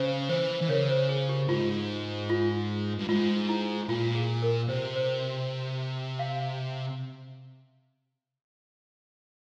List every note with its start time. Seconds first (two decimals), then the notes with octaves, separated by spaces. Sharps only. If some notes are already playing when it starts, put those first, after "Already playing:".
Already playing: C#3 C5
0.29 E3 C5
0.61 E3
0.69 C#3 A#4 C#5
0.89 C5
1.09 G#4
1.29 G4
1.49 G#2 F4
2.29 F4
2.99 G2
3.08 G#2 F4
3.49 E4
3.89 A#2 F4
4.15 G#4
4.42 A#4
4.69 C3 C5
4.96 C5
6.19 F5